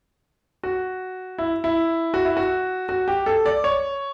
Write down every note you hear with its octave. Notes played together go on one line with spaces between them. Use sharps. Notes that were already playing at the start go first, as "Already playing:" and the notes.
F#4
E4
E4
F#4
E4
F#4
F#4
G4
A4
D5
C#5